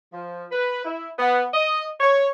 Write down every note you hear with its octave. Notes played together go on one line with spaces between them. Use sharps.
F3
B4
E4
B3
D#5
C#5